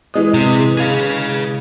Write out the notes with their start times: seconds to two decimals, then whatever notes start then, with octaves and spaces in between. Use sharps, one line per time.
0.14 E3 G#3 D#6
0.34 C3
0.77 G#4 F5